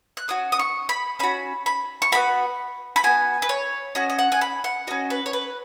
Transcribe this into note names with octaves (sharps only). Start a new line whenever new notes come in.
F#6
C#4 F#4 D#6
D#6
C#6
B5
C#4 F#4 B5
B5
C#6
B3 F#4 B5
B5
B3 F#4 G#5
B4
C#5
C#4 F#4 D#5
D#5
F#5
G#5
B5
F#5
C#4 F#4 D#5
B4
C#5
B4